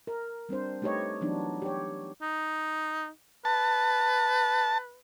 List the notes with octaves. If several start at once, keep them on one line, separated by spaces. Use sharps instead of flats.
A#4
G3 C4 D4 C5
A3 D#4 G4 B4 C#5 D#5
E3 F#3 B3 D4 D#4
G4 C#5
D#4
B4 A5